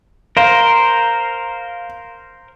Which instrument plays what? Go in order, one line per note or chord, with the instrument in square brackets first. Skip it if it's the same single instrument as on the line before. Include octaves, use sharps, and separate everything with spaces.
[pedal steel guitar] A#4 C5 [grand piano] F5